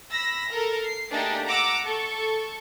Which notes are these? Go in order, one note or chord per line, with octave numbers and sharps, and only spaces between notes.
B5 E6 A#6
A4 A#4
C7
A3 A#3 D4 D#4 G4 G#4
F#5 A#5 D6 E6
A4 C#6